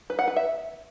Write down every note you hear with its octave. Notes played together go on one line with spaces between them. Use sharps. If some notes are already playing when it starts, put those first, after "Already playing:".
B4
F#5
B4
E5